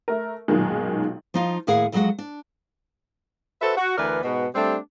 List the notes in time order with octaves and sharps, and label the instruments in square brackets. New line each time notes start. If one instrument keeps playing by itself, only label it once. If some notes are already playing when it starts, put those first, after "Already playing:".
[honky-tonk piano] A3 A#4
B1 F#2 A#2 D#3 G#3
[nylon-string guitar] F3 D#4 F4
D#2 A2 G#4 A#4 F5 F#5
F2 F#3 G#3 A3 F#4 F#5
D4
[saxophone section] F#4 A4 B4 C5 E5
F#4
D2 E3 A#4 B4 D5
G#2 B2 B3 F#4
G3 A3 C4 D4 G4